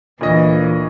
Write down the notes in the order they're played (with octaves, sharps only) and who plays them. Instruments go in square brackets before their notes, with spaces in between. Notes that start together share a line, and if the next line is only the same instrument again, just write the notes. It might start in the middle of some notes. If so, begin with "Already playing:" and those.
[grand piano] D2 D#5 A#6 [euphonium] A#2 [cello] E3